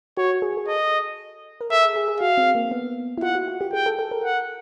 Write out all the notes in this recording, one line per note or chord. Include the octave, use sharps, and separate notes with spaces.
F#4 C#5
G#4
G#4
A4 D#5
A#4
A4 E5
G#4
G#4
G#4
F#4 F5
C4
A#3
B3
E4
F4 F#5
F#4
F#4
G4
G#4 G5
A4
A4
A#4
F#5